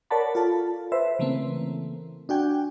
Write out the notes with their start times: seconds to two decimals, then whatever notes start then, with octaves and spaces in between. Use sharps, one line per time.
0.11 A#4 C#5 D5 F#5 A5 B5
0.35 F4 A4 A5
0.92 B4 C5 E5
1.19 C#3 E3 A3 A#3 C4
2.29 D4 F#4 G5 G#5